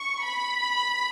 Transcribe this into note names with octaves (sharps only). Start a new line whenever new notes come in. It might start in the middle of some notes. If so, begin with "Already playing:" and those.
Already playing: C#6
B5